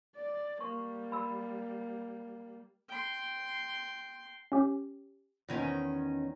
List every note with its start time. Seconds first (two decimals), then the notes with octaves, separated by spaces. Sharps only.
0.15 D5
0.61 G3 A#3 C#6
1.12 B5 E6
2.88 G5 C6
4.52 C#4 G4
5.49 E2 D#3 C#4